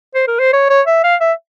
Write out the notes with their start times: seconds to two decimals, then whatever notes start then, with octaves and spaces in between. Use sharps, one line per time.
0.15 C5
0.28 A#4
0.39 C5
0.53 C#5
0.70 C#5
0.87 E5
1.04 F5
1.21 E5